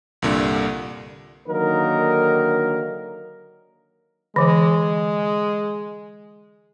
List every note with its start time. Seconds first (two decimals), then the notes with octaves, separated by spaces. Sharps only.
0.22 C2 G2 A#2 D3
1.48 D3 D#3 F#3 A#3 D#4 A#4
4.36 D3 E3 G#3